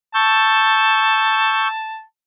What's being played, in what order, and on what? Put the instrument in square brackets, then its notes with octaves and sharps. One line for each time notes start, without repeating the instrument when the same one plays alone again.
[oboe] A5 [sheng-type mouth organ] C#6 E6 G6